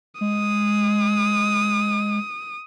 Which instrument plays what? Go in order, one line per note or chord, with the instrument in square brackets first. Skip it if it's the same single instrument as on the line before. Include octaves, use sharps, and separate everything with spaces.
[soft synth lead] G#3 [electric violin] D#6